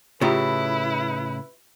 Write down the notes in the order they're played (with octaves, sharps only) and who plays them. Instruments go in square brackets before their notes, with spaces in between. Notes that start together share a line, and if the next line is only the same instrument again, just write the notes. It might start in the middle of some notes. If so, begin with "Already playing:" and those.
[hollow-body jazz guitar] A2 C#3 [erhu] E4 [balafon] F4 G4 A#5 [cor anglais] B4